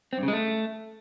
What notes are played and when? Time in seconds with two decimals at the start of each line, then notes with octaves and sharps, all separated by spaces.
0.13 C4
0.18 G2
0.23 C#3
0.28 G#3
0.33 A3